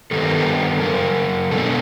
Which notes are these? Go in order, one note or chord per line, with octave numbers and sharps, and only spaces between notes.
G2 D#3 G3 B3 A4
A#4
A4
F#2 C#3 A#4
B2 G#3 B3 D4 A4